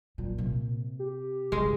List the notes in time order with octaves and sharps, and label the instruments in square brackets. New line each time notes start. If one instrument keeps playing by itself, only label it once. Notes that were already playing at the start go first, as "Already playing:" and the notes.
[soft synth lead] A#2 [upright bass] F#3
[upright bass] C3
[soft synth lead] G4
[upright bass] G2 C#3 [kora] G#3